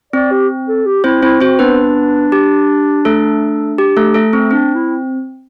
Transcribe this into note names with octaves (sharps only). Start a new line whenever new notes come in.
C4 D5
G4
A4
G4
C4 E4 C5
C4 E4 C5
C4 F#4 C5
B3 D4 B4
G4
A3 A4
G4
A3 A4
A3 A4
C4
C4 D4
E4